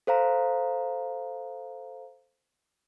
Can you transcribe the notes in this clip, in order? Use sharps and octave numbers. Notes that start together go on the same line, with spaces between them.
A4 C5 F5 A#5